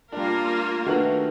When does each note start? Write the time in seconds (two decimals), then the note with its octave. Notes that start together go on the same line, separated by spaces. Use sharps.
0.12 G3 A#3 D4 F4 A#4
0.86 D#3 A3 D4 F#4 B4 F#7